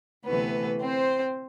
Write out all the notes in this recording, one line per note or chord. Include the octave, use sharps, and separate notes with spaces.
D2 C3 E3 A3 B3 B4
C4 C5